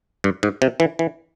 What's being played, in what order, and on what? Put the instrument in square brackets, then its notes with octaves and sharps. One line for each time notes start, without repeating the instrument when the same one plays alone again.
[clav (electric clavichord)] G2
G#2
C3
E3
E3